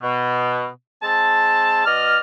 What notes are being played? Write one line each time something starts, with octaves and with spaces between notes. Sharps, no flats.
B2
G#3 C4 A5
B2 D5 D#5 F6